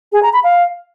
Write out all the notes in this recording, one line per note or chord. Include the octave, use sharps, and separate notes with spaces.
G#4
A#5
B5
F5